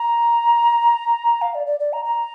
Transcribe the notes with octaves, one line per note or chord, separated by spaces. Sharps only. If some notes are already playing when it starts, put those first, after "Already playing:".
Already playing: A#5
F5
D5
D5
D5
A#5
A#5